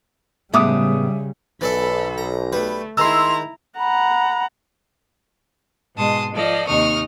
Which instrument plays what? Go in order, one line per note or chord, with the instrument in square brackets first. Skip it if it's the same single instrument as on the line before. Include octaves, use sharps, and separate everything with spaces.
[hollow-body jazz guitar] A2 G#3 B3 [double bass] C#3 G3 [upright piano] E5 D6 D#6
[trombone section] B1 [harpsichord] E3 D5 E5 [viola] A4 B5
[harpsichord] A#5
[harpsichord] G3 B4 [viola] A3
[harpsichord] D#3 G#3 [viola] E4 A#5 [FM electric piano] C6 E6
[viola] F#5 A#5 [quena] B5
[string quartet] G#2 B2 G#3 A5 C6 D#6
F3 F4 A4 D5 D#5
D#2 C3 D#4 C#6 D#6 F6